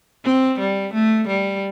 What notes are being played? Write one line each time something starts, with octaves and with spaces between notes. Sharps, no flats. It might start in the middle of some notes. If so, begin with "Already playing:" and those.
C4
G3
A3
G3